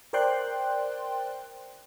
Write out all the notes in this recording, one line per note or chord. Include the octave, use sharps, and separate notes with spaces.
A#4 C5 D5 G5 C6 F#6